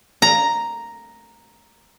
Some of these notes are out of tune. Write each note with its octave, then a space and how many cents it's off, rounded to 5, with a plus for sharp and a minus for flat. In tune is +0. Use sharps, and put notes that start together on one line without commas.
A#5 +0